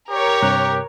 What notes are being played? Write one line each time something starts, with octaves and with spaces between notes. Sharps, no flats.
G4 A#4 C#5
G2 C3 F#6